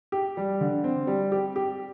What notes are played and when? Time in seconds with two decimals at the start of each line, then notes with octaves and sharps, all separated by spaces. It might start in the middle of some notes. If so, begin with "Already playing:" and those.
0.12 G4
0.37 G3
0.61 D3
0.84 C4
1.07 G3
1.32 G4
1.56 G4